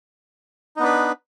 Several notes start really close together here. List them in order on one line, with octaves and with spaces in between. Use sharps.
D#4 B3 D4 B4